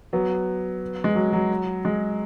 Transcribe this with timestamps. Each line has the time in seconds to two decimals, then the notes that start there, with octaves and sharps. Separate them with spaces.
0.13 F#3 B3
1.04 G#3
1.15 F#3
1.33 F#3
1.85 G#3